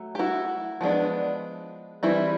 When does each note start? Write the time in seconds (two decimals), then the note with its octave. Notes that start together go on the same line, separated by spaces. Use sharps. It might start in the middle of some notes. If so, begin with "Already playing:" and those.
Already playing: F#3 A3
0.15 G4
0.19 E4 F#4
0.81 F3 G#3 B3 D4
2.03 E3 G3 C4 E4